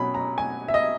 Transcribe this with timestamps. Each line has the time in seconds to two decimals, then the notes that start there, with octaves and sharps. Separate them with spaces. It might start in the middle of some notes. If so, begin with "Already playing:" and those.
Already playing: B2 F#3 C#4 B5
0.14 A#5
0.38 G#5
0.68 E5
0.74 D#5